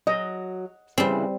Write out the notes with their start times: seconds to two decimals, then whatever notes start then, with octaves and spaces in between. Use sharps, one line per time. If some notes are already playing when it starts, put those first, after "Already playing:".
0.07 F#3 D#5
0.98 C#3 E3 G3 C4